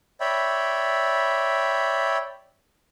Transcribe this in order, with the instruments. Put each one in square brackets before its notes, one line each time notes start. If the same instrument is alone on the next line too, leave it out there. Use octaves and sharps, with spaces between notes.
[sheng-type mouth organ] C#5 D5 E5 G5 B5